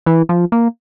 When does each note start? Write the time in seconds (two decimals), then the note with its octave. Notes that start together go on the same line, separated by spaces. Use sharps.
0.06 E3
0.29 F3
0.52 A#3